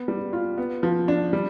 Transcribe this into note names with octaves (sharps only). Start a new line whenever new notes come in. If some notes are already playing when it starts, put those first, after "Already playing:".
Already playing: B3
G3
F4
B3
F3
D4
G3